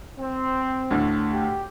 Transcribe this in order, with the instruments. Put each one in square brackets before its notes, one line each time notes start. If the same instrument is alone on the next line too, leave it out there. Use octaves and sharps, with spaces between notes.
[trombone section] C4
[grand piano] D2 A2 D3
[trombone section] G4